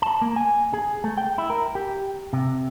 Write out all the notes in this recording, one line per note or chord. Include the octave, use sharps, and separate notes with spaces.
A5
A#3
G#5
G#4
A3
G5
E4
A#4
G4
C3